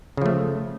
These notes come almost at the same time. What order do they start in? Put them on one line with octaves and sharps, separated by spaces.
C#3 F3 A3